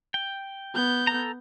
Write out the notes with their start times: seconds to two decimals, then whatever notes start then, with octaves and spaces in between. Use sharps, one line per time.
0.14 G5
0.74 B3 G6
1.07 A4 A#5